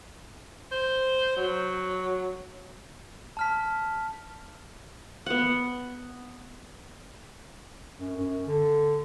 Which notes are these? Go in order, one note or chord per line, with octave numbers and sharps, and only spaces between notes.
C5
F#3
A5 F6 B6
B3 F#5
F#2
F#2
D3